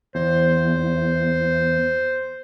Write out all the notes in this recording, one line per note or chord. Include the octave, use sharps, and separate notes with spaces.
E2 C5